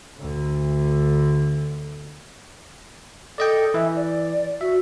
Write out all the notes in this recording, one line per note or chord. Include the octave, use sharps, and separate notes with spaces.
D2 D3
A4 D5 D#5 G5
E3 E5
D5
F#4 E5